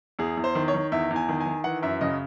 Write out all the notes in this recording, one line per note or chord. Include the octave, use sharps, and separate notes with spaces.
E2 G#4
E2
C5
D#3
C#5
D#3
E2 E5
E2
G#5
D#3
G#5
D#3
E3 F#5
F#2 E5
C#3 D#5